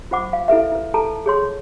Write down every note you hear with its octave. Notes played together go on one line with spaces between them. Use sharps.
F4 C5 F#5 D6
F5
E4 A4 B4 E5
E4 B4
A4 A5 A#5
G#4 C#5 C6